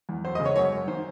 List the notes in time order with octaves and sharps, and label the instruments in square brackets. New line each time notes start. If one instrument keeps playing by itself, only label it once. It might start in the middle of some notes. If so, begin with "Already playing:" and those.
[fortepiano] E2
F#2 C5
C#3 D#5
C#5
F#2 C#5
F#2
D#3 C5